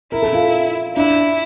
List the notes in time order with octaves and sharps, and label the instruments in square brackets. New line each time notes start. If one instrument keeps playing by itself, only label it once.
[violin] E4 [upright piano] A#4
[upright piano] A4
F4
[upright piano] D4 [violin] E4